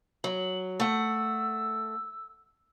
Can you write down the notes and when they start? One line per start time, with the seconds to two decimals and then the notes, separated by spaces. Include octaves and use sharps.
0.24 F#3 F#7
0.80 A3 F#5 E6